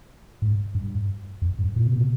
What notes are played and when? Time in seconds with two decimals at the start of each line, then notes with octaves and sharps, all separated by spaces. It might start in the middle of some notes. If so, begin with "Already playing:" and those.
0.42 G#2
0.75 G2
1.42 F2
1.59 G2
1.76 A#2
1.87 C3
1.97 A#2